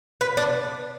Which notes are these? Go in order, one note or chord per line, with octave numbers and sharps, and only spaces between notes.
B4
D4